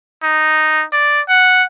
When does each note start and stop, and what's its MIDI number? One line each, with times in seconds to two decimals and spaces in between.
0.23 0.84 63
0.93 1.21 74
1.29 1.63 78